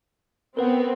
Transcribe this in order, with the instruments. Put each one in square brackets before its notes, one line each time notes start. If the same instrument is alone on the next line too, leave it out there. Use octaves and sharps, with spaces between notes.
[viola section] B3 C4 [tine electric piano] A#4 B4 F#5